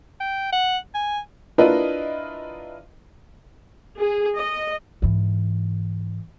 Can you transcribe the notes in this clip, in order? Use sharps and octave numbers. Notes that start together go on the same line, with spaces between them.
G5
F#5
G#5
D4 E4 F4 A#4 B4 D#5
G#4
D#5
G#2 E3